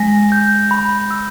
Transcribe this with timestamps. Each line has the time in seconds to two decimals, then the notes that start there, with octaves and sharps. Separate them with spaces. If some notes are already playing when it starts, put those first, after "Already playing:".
Already playing: G#3 A#6
0.32 G6
0.71 B5
1.11 E6